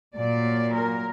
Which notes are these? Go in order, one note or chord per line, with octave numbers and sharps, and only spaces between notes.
A#2 F#3 A#3 D5
A#4